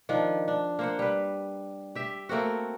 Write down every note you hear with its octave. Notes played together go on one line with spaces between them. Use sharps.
D#3 F3 D4
D4
A#3 C5 F#5
G3 B4
G4 E5
A3 A#3 C4 F#4